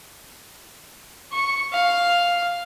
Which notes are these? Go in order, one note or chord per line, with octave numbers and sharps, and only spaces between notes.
C#6
F5